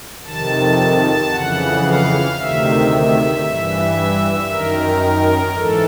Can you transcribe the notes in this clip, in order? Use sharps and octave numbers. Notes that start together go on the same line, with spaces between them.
F2 C3 D#3 A5
F2 C#3 E3 F#5
F5
D2 C3 D#3 E5
E5
G2 E3
F#2 D#3 A#4
G#2 E3 A4